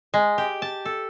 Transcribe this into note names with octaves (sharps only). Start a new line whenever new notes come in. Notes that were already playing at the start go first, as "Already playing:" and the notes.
G#3
G4
A5
A4